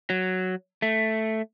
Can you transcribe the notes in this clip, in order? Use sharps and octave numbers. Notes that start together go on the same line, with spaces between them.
F#3
A3